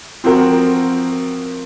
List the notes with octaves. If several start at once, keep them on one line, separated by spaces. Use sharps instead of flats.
F3 C4 F#4 A#4